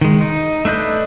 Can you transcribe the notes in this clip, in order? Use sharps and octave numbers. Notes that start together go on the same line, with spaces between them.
D#3 G#3
D#4
A3 D4 B4 D#5 G6